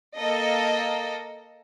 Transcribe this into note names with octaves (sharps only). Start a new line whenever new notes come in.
A#3 A4 D#5